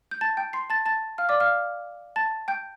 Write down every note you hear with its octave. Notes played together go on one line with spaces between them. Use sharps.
G6
A5 A6
G5 G6
C6 C7
A5 A6
A5 A6
F5 F6
D5 D6
F5 F6
A5 A6
G5 G6